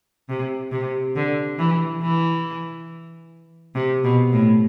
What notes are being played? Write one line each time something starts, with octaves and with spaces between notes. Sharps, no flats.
C3
C3
D3
E3
E3
C3
B2
A2